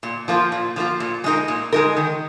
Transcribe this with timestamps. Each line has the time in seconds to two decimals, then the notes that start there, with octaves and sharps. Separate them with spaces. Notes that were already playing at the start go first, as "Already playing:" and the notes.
0.03 A#2
0.28 F3 A#3 F4
0.52 A#2
0.76 F3 A#3 F4
1.00 A#2
1.24 G#3 D#4 A#4
1.48 A#2
1.72 G#3 D#4 A#4
1.97 D#3